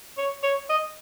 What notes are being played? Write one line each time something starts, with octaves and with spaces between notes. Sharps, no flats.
C#5
C#5
D#5